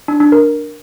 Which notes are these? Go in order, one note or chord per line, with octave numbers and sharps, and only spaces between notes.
D4
D4
A#4